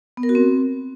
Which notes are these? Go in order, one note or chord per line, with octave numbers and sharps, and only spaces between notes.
B3
A#4
F#4
C4